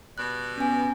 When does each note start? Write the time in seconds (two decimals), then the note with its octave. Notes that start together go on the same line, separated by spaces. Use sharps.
0.18 B2 G3 F#6
0.58 B3 C#4 G#5